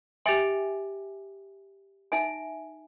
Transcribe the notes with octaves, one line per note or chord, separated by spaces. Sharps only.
G4 E5 G5 G#5 A6 F#7
D#4 E5 G#5